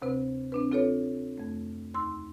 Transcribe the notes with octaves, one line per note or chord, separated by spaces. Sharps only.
D2 C3 C4 B4
C4 D4 B4
C4 F4 A4 B4 C#5
F2 A3
D#2 C6 E6